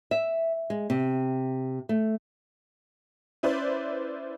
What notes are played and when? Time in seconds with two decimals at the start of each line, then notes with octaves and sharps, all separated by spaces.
0.11 E5
0.70 G#3
0.90 C3
1.89 A3
3.43 C#4 E4 B4 C5 D5